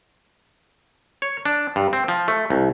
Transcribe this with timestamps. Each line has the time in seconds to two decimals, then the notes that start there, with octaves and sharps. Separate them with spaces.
1.22 C#5
1.46 D4
1.76 G2
1.93 C4
2.08 F3
2.28 A3
2.50 C2